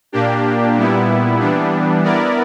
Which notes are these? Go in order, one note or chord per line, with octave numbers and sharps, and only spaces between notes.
A#2 A#3 D4 G4
A#2 G3 B3 E4
E3 G3 B3 D4
B3 E4 A#4 D5